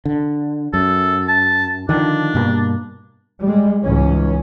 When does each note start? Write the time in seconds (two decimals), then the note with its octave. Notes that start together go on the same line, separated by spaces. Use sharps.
0.05 D3
0.74 F#2 A4
1.28 A5
1.89 D3 D#3 F3 D4
2.35 G2 B2 A#3
3.40 G3 G#3
3.83 C#2 G#2 E3 C#4